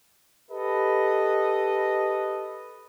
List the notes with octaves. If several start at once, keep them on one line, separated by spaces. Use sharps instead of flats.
G4 A4 B4 D#5